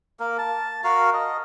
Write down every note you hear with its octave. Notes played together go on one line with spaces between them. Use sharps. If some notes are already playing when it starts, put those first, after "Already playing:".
A#3 A#4
A5
F#4 A#4 F5
D#5